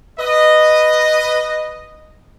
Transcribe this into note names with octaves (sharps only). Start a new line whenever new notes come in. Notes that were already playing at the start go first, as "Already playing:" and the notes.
B4 D#5